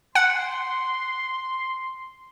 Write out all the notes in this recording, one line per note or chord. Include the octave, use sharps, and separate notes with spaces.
F#5 C6